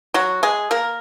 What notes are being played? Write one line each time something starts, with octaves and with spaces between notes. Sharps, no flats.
F#3 F#4
G#3 G#4
A#3 A#4